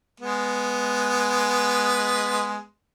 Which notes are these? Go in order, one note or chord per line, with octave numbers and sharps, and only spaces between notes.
G#3 B3